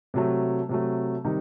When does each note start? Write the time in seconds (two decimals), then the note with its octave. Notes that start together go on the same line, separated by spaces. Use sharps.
0.14 C3 F#3 A3
0.69 C3 F#3 A3
1.25 C3 D#3 G3 D#4